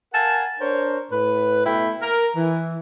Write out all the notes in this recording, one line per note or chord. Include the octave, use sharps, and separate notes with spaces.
A#4 F5 F#5 G#5 A5
D4 A#4 C5 C#5
A2 B4
B2 A3 E4 G5 B5
A#4
E3